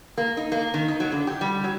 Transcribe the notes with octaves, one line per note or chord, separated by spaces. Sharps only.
A#3
D#4
A#3
D#3
D#4
F#3
D3
G4
G3
F#3